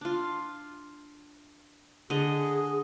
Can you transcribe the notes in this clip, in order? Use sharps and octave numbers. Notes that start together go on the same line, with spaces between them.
D4 F4
D3 G#4 D#5